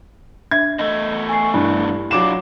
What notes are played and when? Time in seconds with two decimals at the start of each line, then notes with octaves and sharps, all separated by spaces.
0.51 D4 E5 G#6
0.79 E2 A3 D#5
1.29 G#5 C#6 C7
1.54 G2 E4 G4 B5
2.11 F#3 D4 F4 D6 E7